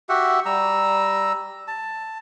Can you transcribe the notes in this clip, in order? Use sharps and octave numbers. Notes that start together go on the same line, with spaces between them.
F#4 G4 E5 F#5
G3 A#5 E6
A5